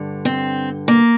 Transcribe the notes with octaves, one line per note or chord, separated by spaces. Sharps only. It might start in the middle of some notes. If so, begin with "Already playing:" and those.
Already playing: G2 D3
C4
A#3